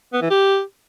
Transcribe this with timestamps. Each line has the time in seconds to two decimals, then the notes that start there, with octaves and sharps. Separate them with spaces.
0.13 B3
0.22 E3
0.30 G4